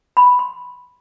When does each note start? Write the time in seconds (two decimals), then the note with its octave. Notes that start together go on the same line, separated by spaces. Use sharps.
0.17 B5
0.39 C6